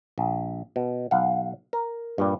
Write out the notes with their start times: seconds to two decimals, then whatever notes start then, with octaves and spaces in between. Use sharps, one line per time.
0.18 A#1
0.76 B2
1.11 B1 F5 F#5
1.73 A#4
2.18 G2 A#2 G3